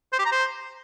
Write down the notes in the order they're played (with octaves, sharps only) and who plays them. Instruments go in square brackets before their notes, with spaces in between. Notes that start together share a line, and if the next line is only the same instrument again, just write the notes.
[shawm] C5
G4
A#5
C5